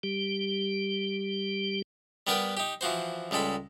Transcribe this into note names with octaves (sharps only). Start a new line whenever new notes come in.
G3 G4
G3 B3 A#4 B4 F#5 G5
D#4 G4
E3 F3 F#4 C5
C#2 G3 G#3 A4 B5